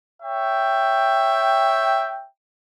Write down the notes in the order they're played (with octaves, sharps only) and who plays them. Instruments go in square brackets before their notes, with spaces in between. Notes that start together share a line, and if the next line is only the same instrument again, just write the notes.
[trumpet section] C#5 E5 G5